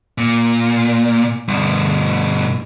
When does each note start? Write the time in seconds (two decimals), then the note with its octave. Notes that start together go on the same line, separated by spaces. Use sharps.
0.18 A#2
1.48 G2 B2